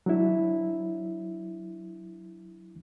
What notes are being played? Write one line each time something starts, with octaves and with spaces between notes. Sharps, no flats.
F#3 D4 E4